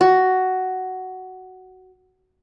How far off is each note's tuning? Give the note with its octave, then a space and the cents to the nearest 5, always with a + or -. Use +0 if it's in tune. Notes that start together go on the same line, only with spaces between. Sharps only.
F#4 +10